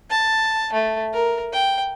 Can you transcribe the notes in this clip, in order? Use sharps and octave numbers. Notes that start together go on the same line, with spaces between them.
A5
A3
A#4
G5